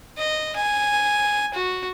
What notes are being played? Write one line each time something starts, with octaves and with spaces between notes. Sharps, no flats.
D#5
G#5
F#4